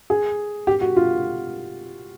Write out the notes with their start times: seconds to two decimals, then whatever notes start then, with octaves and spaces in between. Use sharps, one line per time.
0.10 G#4
0.67 G4
0.81 F#4
0.96 F4